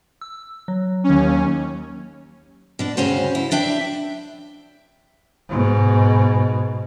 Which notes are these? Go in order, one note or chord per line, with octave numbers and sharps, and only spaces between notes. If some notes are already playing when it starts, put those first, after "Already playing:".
E6
F#3
D#2 C#4
B2 D4
D2 G2 C#3 C#4 F#4 C5
E4
E3 D4 E5 G5
G#2 B2